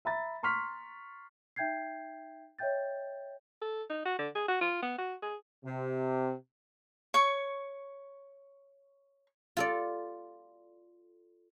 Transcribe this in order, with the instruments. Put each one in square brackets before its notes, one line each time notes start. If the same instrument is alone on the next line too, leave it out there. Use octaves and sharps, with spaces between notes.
[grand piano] E5 A#5 B5 A6
A#5 C6 C#6 F6 B6
[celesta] D#4 E5 G5 G6 G#6 C7
C#5 D#5 E5 G5 G6 A6
[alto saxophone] A4
D#4
F#4
D3
G#4
F#4
F4
B3
F#4
G#4
[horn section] C3
[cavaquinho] C#5 C#6
[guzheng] F4 A4 D5